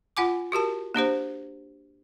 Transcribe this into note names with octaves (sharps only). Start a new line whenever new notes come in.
F4 F#5 G#5 D6
F#4 G4 A#4 A5
A#3 D4 G4 C5